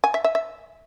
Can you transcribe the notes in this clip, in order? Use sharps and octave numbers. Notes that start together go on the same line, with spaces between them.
G#5
E5
E5
E5